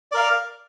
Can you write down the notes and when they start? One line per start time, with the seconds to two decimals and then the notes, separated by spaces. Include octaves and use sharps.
0.12 D5
0.14 A#4
0.17 F5